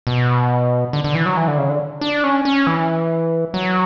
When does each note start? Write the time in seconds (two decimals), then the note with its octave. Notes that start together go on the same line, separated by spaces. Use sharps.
0.07 B2
0.93 D3
1.04 D3
1.15 E3
1.26 F#3
1.37 E3
1.48 D3
1.58 C#3
1.69 D3
2.01 D4
2.24 C#4
2.45 C#4
2.67 E3
3.54 F#3